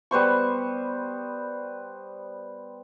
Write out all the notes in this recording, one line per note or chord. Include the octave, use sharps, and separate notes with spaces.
G3 B3 C5 C#6